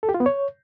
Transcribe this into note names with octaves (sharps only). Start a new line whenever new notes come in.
A4
G4
F4
B3
C#5